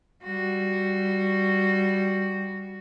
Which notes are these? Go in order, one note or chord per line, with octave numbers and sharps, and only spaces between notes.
G3 F#4